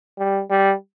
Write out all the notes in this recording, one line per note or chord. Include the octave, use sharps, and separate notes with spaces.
G3
G3